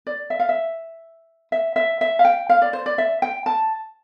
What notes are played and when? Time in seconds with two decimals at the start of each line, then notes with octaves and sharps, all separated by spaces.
0.07 D5
0.30 E5
0.39 F5
0.49 E5
1.52 E5
1.76 E5
2.01 E5
2.19 F5
2.25 G5
2.49 F5
2.62 D5
2.73 C5
2.86 D5
2.98 E5
3.22 G5
3.46 A5